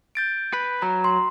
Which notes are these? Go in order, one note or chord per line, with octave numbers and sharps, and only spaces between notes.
G6 A6 D7
B4
F#3 A#5
C6